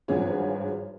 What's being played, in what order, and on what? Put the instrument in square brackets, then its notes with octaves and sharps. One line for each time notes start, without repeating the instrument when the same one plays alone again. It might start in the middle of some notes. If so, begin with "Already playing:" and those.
[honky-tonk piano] G#1 G2 F3 F#4 G#4 C#5